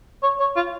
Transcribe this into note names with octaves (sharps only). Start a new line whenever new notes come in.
C#5
C#5
F4